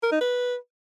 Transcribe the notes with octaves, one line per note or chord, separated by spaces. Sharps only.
A#4
D#4
B4